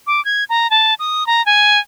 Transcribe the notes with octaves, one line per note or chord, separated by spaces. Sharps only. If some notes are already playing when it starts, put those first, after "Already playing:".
D6
G#6
A#5
A5
D#6
A#5
G#5